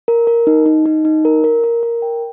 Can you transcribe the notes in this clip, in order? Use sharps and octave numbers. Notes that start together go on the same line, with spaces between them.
A#4
A#4
D#4
D#4
D#4
D#4
A#4
A#4
A#4
A#4
G5